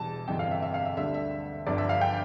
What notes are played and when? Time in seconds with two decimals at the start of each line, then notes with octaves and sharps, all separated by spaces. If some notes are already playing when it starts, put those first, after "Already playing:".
Already playing: E1 E2 E3 G3 A5
0.28 G1 F2 C3 E3 G3 G5
0.39 F5
0.51 E5
0.62 E5
0.74 F5
0.85 E5
0.97 D2 D3 G3 E5
1.14 E5
1.67 G1 G2 F3 D5
1.78 E5
1.89 F5
2.01 G5